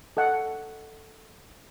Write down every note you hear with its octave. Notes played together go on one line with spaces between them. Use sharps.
A4 D#5 F#5